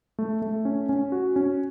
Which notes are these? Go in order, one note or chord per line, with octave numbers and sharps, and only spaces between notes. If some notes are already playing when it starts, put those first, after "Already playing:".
A3
A3
C#4
C#4
F#4
C#4